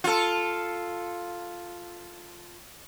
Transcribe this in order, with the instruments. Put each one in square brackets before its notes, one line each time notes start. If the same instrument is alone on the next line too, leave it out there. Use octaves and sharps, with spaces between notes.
[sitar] F4 A4